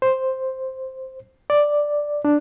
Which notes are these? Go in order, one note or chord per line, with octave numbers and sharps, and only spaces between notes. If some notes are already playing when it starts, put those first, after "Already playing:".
C5
D5
D4